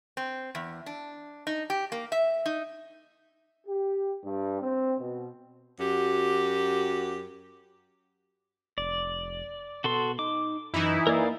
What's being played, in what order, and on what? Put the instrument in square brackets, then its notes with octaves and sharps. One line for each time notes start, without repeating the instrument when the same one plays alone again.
[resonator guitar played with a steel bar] C4
E2
D4
D#4
G4
A#3
E5
D#4
[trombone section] G4
G2
C4
B2
[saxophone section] F#2 F#4 G4
[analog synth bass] F1 [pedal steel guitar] D5
[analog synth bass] B2 [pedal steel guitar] F#4 A4 C6
[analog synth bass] D#4 [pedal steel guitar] D6
[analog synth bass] F#2 [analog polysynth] E3 D#4 E4
[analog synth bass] A#3 [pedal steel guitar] A#4 D5 F5